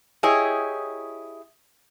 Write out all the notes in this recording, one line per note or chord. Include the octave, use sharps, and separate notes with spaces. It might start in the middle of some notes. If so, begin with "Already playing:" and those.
E4 G4 G#4 C#5 D#5